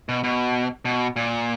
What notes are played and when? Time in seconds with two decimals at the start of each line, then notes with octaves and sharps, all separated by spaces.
0.09 B2
0.24 B2
0.85 B2
1.16 A#2